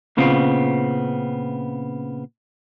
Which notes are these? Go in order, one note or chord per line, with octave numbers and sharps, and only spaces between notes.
A#2 C#3 B3 C4 F4